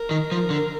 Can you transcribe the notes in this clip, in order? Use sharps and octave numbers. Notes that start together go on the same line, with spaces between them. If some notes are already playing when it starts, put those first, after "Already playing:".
Already playing: A#4
D#3
F3
D3